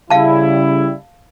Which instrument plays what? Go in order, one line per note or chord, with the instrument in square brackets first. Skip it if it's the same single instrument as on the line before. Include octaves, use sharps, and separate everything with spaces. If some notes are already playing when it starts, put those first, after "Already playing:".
[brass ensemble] C#3 G3 E4 [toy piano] F5 A5